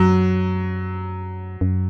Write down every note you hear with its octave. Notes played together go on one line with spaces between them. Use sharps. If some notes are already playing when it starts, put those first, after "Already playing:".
Already playing: F#2 F#3
F#2